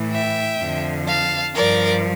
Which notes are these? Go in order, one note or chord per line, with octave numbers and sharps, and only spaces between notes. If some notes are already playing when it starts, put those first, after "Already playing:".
Already playing: A2 E3
E5 G5
F2 D3 F3
F5 A5
G2 F3 A#4 D5